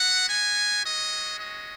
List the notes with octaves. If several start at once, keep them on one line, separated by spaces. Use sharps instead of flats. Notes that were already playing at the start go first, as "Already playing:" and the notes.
Already playing: B3 F#4 F#5
G#5
G#3 C#4 F#4 D#5
D#5